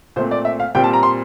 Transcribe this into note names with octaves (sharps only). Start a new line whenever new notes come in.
A#2 A3 C4 C5
D5
E5
F5
A#2 G3 C4 G5
A5
A#5
C6